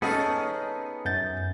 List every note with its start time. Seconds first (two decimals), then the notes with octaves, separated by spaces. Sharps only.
0.02 B3 C#4 D#4 G#4 A4 D#5
1.05 F#2 G6 A6